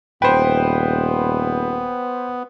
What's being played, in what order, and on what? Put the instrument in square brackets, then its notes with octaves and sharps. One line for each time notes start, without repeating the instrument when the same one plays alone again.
[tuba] D#1 [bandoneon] B3 [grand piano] B4 C5 [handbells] G5